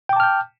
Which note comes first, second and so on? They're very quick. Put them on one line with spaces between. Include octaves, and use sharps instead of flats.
G5 D6 A5 F6 G6